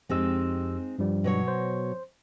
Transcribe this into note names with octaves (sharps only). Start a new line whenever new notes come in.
F2 G#3 C4 D#4 G4 E6
G2 F3 G3
B2 F#3 C#5
C5